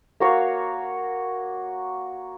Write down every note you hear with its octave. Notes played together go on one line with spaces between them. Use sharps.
A#3 F#4 C#5 F5